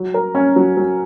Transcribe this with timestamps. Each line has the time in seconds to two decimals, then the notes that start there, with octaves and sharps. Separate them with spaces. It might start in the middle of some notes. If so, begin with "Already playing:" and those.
Already playing: F#3
0.14 A#4
0.35 C#4
0.56 F#3
0.77 F#3